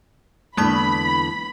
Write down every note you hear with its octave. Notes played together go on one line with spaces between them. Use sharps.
E2 D3 E3 G#3 A#3 A5 B5